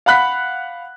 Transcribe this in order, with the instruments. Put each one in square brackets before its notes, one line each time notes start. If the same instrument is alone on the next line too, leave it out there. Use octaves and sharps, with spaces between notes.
[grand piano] F5 F#5 B5 F#6 B6